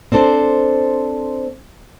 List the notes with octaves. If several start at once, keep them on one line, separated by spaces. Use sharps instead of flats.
C4 D4 A4 C5